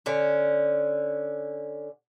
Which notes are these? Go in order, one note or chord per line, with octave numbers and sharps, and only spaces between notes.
D3 C#4